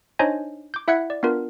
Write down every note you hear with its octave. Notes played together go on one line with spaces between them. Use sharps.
D4 D#4 C5 C#5 D#5 G#5
D6 G6
E4 E5 F#5 F#6 G#6 C#7
D5
B3 D4 F4 A#4